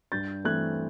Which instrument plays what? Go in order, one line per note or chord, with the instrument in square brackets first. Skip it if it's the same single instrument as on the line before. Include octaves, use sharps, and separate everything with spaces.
[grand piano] G2 G6 A6
E3 A3 C4 F#6 G#6